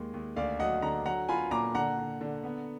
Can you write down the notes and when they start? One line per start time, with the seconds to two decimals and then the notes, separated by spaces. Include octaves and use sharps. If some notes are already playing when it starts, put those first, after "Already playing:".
Already playing: D#2 G#3
0.14 D#2
0.36 D2 D5 F5
0.59 F#3 D#5 F#5
0.82 D3 F#5 A#5
1.05 F#3 F#5 A#5
1.29 F4 G#5 B5
1.51 A#2 A#5 D6
1.75 D3 F#5 A#5
1.98 D3
2.21 D3
2.44 B3